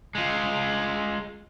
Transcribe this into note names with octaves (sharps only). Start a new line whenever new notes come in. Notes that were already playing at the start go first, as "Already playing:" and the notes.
G#3 F4